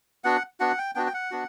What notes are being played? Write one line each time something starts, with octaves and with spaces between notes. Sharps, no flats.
B3 D4 F#4 F#5
B3 D4 F#4 F#5
G5
B3 D4 F#4 G5
G5
F#5
B3 D4 F#4